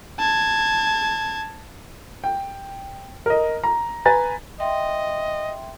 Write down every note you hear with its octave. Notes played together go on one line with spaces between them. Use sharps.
A5 G#6
G5
A#4 D#5
A#5
B4 G#5 A#5 A6
D#5 E5 G5 C6